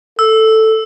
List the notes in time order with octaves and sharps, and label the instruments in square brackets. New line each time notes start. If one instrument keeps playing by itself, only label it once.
[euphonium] A4 [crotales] E6